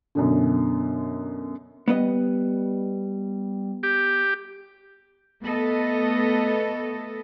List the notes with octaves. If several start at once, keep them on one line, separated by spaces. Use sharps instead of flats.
F#2 B2 D3
G3 B3 B4 D#5
G4
A3 B3 A4 D#5